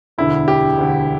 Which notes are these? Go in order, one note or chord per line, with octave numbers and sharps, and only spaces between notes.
E1 D2 D3 E4
G4
E1 D2 D3